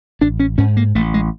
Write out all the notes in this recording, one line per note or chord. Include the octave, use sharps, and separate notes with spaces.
A1 D4
C#4
G#2 C#4
A#3
A1 A3
G#3